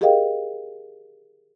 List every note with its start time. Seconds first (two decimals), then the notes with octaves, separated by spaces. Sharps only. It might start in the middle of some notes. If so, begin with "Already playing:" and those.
0.01 G4 G#4 A#4 D#5 F5 G5